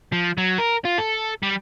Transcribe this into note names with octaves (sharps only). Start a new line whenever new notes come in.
F3
F#3
A#4
F4
A4
G3